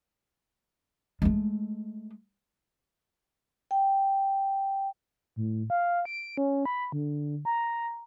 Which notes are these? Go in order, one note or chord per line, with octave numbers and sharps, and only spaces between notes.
G#3 A3
G5
A2
F5
D7
C#4
B5
D3
A#5